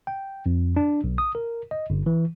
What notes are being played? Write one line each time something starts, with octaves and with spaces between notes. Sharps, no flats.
G5
F2
D4
B1
D#6
A#4
D#5
G1
E3